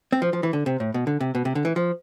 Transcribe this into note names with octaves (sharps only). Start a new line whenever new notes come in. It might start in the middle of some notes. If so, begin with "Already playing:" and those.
C4
F3
F3
E3
D3
C3
A2
B2
D3
C3
B2
C3
D3
E3
F3